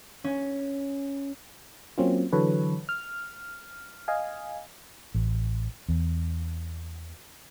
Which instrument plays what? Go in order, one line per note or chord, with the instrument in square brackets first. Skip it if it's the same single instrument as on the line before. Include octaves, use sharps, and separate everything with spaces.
[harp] C#4
[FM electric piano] F#3 A#3 C4 C#4 F4
D3 E3 F#3 A4 B4 C#5
F6
D#5 F5 G#5
[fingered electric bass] A1
E2